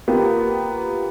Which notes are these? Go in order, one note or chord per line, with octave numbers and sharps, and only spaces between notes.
A#3 B3 F4 G4